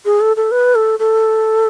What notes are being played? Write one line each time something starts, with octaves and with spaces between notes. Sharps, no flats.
G#4
A4
A4
B4
A4
A4